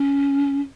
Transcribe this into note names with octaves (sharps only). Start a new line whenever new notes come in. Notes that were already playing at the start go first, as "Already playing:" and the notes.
Already playing: C#4